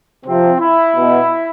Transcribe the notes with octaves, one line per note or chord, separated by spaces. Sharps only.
C3 F3 C4
E4
B2